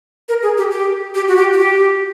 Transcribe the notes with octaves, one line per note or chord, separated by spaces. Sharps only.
A#4
G#4
G4
G4
G4
F#4
G4
F#4
G4